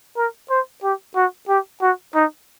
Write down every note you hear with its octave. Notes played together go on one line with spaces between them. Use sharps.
A#4
C5
G4
F#4
G4
F#4
D#4